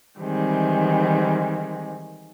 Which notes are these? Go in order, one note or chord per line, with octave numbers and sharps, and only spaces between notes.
D#3 E3 G3 G#3 C4